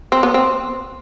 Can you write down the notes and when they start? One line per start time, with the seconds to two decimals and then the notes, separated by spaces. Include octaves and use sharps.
0.12 C4
0.23 B3
0.34 C4